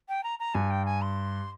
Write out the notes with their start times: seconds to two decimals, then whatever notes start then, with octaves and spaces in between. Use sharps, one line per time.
0.09 G5
0.23 A#5
0.39 A#5
0.54 G2 G#5
0.70 G5
0.85 G#5
1.02 C6